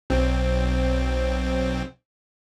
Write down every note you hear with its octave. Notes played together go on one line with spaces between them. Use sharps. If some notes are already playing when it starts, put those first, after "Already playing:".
B1 C4